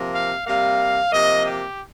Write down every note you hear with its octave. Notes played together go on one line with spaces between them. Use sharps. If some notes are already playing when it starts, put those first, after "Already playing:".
Already playing: C3 F3 A#3
F5
C3 G3 A#3 F5
C3 F3 A#3 D#5
G4